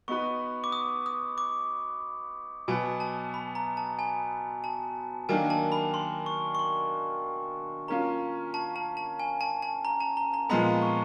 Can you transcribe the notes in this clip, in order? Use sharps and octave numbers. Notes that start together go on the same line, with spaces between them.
B3 D#4 F#4 B4 C#6
D6
D#6
D#6
D6
B2 F#3 B3 G#5
A5
B5
A#5
A5
G#5
A5
D#3 F#3 A#3 D4 G#5
A5
B5
C6
C#6
C#6
C6
A#3 C#4 F4 A#5
A5
A5
A5
G#5
A5
A5
A#5
A5
A#5
A#5
A#2 F3 G#3 B3 B5
C#6